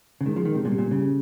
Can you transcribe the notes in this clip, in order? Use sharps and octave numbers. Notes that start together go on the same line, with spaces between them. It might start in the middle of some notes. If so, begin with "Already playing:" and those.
C#3
D#3 G#3
F3
D#3
C3
A#2 G3
C3
A#2
C#3